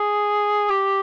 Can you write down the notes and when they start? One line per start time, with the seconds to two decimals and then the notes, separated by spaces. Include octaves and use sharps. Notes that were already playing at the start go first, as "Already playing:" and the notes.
Already playing: G#4
0.69 G4